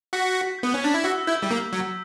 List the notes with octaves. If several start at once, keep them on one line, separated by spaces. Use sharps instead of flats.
F#4 B6
B6
B3 G6
C#4
D4 B6
E4
F#4 E6
E4 G6
G3
A#3 G6
F#3 E6